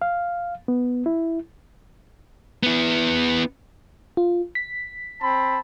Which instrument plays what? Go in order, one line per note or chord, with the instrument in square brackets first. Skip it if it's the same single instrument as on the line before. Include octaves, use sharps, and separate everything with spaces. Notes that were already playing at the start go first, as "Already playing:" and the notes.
[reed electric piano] F5
B3
E4
[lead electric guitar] B3 E4
[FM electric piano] F4
B6
[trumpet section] C4 A5 B5